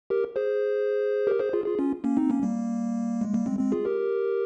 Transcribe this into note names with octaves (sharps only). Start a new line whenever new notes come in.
G4 A#4
G#4 C5
G4 A#4
G#4 C5
F4 G#4
F4 G#4
C#4 F4
A#3 C#4
C4 D#4
A#3 C#4
G3 A#3
G#3
G3 A#3
G#3 C4
G#3 C4
F4 G#4
G4 A#4